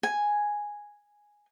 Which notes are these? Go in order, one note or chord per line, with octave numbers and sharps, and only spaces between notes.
G#5